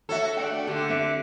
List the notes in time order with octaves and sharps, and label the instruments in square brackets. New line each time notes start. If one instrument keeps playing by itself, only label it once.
[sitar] F#4 A4 [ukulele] C#5 E5
[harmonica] A3 D4 F#5 [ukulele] G5
[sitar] D3 [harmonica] A3 [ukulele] G4
[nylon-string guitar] C4 E5 [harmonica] D6